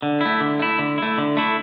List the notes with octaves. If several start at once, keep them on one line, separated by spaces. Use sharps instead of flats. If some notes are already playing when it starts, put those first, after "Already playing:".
D3
A3 E4
D3
A3 E4
D3
A3 E4
D3
A3 E4